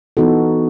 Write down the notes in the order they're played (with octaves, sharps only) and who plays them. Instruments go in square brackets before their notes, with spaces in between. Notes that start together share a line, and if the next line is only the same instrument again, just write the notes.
[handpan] E3 B3 D#4 F#4 A4